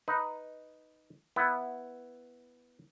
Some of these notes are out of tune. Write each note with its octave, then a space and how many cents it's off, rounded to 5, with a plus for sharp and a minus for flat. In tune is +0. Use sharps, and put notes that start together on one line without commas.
D#4 +0 B4 +0
B3 +0 E4 +0